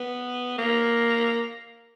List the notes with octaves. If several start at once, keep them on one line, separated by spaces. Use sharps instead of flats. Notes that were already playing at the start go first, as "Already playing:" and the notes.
Already playing: B3
A#3